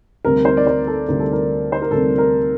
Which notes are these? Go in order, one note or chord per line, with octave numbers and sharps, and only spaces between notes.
D2 C3 G3 C4 A#4
C5
D5
C5
A4
D2 C3 G3 C4 A#4
A4
A#4
C5
A#4
D2 C3 G3 C4 A4
A#4